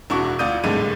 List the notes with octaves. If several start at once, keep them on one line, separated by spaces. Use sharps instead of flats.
E1 D4 E4 F#4 C#6
D2 F4 D5 D#6 G6 D#7
G#1 A2 D3 G3 G#3 D#7